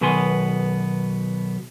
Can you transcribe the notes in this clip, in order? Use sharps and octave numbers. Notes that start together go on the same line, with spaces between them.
B1 B2 D#3 B3 G#5 C6